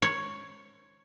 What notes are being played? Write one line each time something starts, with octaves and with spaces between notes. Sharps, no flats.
C#5